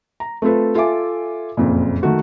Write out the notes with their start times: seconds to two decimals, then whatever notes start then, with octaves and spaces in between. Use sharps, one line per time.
0.20 A#5
0.42 A3 C4 F4 A4 B4
0.75 F4 A4 E5 G#5 D6
1.57 F#1 F2 A#2
2.03 D#3 A3 F#4